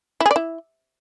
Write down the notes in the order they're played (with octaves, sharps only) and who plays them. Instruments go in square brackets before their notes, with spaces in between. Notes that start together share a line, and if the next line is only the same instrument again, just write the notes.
[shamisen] E4
G#4
D5
E4